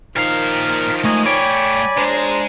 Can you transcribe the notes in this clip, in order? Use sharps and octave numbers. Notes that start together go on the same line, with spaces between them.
A#2 D#3 F3 A#4 F5
G#3 A3 D#5 G#5 A#5
A3 C#5 D5 G5 G#5 B5
G#3 D4 C5 A#5